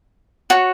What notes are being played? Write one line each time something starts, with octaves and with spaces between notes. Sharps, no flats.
F#4 C#5